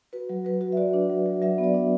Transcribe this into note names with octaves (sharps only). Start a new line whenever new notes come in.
F#4 B4
F#3
F#3 B4
F#4
E5
F#4 D5
D4
F#3
F#3
F#3 E5
B3
D5
D4